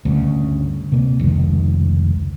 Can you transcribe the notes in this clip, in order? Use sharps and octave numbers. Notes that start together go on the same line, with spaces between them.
D2 G2 C#3
C3 A#3
F1 C#2 D#3 G#3